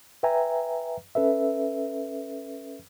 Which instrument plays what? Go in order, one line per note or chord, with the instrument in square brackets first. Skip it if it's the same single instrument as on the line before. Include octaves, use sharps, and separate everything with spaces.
[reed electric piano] B4 E5 G5 G#5 A#5
C#4 A4 B4 E5